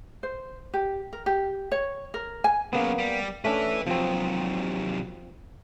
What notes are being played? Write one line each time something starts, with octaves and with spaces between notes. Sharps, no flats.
C5
G4
A#4
G4
C#5
A#4
G#5
C#3 F#3 A#3 B3
G3
A3 C#4 D4 B4 E5
C3 F3 F#3 C4